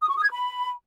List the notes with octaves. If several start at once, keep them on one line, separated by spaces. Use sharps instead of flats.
D#6
C#6
D#6
G#6
B5